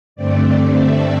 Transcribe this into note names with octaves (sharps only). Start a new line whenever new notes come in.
G2 D3 A3 C4 D5
E5